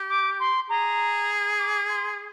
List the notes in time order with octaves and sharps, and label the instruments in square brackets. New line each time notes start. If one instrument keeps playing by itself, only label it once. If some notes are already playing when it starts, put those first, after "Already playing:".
Already playing: [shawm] G4
[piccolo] D6
C6
[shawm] G#4 [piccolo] A#5
[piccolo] D6
C6